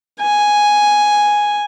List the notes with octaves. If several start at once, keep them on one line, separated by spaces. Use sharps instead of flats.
G#5